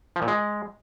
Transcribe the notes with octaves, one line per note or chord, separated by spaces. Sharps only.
F3
A#2
G#3